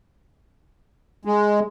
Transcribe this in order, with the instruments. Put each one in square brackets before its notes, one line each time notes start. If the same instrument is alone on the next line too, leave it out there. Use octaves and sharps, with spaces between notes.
[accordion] G#3